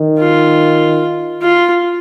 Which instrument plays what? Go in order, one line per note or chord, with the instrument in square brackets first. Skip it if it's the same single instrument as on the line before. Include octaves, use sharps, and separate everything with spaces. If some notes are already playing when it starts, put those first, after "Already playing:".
Already playing: [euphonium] D#3
[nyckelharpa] F4
F4